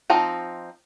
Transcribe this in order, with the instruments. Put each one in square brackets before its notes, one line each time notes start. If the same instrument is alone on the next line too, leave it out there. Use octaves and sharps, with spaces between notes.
[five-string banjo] F3 C4 D#4